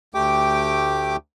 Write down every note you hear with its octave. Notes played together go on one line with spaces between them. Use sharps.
D2 A3 G4 G5 D6